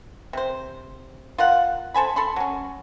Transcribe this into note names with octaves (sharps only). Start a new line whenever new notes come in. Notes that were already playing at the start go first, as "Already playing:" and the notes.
C3 C5
F4 A#4 F5 F#5
A4 C5 G#5 B5
A4 B5 C6
F#3 C#4